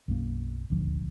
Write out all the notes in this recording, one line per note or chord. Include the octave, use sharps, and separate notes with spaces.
B1 F#2 A#3
D#1 G#1 D2 F3